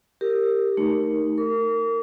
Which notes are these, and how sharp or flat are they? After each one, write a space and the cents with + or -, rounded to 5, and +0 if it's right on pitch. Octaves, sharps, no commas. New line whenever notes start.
G4 +0 A#4 -15
A3 +0 D#4 +0 A#4 +0
A#4 -25 D6 -45